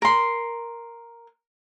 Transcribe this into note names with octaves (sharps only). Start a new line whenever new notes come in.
A#4 C6